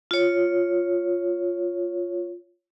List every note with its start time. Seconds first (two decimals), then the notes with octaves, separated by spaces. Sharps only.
0.11 F4 C#5